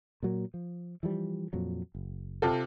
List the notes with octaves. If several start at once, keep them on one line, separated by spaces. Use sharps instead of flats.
A#2 F#3 A#3
F3
E3 F3 G3
F2 A#2 F#3
F#1
C3 F4 A4